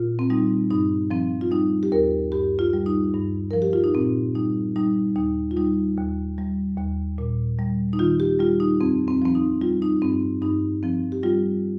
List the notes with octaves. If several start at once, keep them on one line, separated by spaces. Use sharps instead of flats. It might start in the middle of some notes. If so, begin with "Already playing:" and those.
Already playing: A#2 F4
C4
G3 D#4
G2 D#4
F3 C4
F4
G3 D#4
G4
D#2 A#4
G2 G4
F4
G3
D#4
G2
F3 A#4
G4
F4
D#4
A#2 C4
G3 D#4
G3 D#4
D#2 D#4
F4
G3 D#4
D#2
G3
D#2
A#2
G3
D#4
D#3 F4
G4
G3 F4
D#4
F2 C4
C4
F3 C4
D#4
G3 F4
D#4
G2 C4
G2 D#4
F3 C4
G4
G3 F4